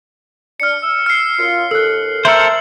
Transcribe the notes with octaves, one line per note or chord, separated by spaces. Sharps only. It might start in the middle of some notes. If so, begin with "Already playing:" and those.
D4 F6 C#7
E6
F6 C7
F#2 F4
D#2 A4 E6 F#6
A4 A#4 C5 E5 A#5 E6 F#7